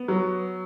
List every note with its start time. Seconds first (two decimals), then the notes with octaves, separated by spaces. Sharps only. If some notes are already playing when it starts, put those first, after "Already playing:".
Already playing: B3
0.08 F#3